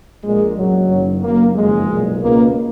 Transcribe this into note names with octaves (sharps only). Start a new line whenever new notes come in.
A#1 A#2 G#3
F#1 F#2 C#3 F#3
F#1 F#2 D#3
F#1 F#2 D#3 A#3
F#1 F2 D#3 G#3
B1 A#2
C#2 B2 A#3